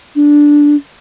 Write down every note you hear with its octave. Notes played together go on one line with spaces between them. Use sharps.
D4